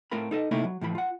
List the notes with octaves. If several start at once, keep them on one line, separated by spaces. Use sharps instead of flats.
A2 A3 C4 F4 A#4 B5
D#4 A4 D#5
C3 A3 A#3 D#4 E4 A4
F#3
A2 E3 F3 B5
F4 F#5